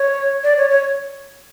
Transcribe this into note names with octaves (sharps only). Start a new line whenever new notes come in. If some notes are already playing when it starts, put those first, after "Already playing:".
Already playing: C#5
D5
C#5
C#5